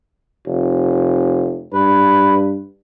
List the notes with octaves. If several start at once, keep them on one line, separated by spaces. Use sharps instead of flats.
F1
G2 B4